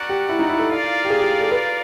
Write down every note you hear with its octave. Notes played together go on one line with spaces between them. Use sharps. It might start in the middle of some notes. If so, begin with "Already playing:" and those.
Already playing: F#4 A#4 D5 F#5
G4
E4
D#4
E4
A4
F4 A#4 D5 F5
G4
G#4
G4
A4
B4